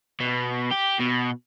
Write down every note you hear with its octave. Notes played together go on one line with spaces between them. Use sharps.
B2
G4
B2